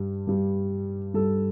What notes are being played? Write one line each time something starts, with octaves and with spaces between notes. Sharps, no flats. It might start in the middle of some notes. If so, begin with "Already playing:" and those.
Already playing: G2 G3
G2 G3
G2 G3 A4